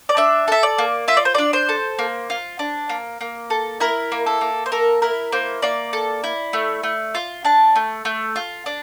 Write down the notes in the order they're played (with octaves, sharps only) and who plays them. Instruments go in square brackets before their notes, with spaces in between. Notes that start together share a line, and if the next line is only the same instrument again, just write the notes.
[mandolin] D5
D4 E5
A4 E5
D5
A#3
F4 E5
D5
C5
D4 D5
C5
A4
A#3
F4
D4
A#3
A#3
A4
E4 A#4
A#3
A4
A#3
C5
A4 A#4
E4 A#4
A#3 C5
A#3 D5
A4
E4
A3
A3
F4
D4 A5
A3
A3
F4
D4